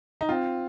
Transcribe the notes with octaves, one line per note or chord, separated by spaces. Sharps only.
D#4
C4 F4